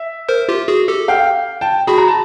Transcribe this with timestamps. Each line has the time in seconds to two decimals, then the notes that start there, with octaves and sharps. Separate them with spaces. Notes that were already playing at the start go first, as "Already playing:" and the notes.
Already playing: E5
0.29 A#4 C5
0.49 F4 G4
0.68 F#4 G#4
0.88 G4 A4
1.08 F5 G5
1.61 G5 A5
1.87 F#4 G#4 B5
1.98 A#5
2.08 A5